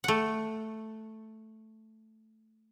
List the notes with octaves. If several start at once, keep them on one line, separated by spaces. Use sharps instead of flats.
A3 F#5